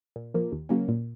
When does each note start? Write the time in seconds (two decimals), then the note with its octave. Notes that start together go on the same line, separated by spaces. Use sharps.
0.16 A#2
0.34 F3 A#3
0.52 D#2
0.69 C#3 F#3 A#3 C#4
0.88 A#2